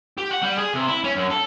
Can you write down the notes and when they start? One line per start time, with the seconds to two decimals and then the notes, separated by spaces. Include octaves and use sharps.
0.18 G4
0.31 F#5
0.43 G3
0.57 G#4
0.74 C3
0.88 E4
1.04 C#4
1.16 F#2
1.31 A4